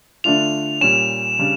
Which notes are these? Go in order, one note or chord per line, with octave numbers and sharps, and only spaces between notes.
D3 A3 D4 F4 F7
A#2 G3 C#4 E7
C#3 G3 D4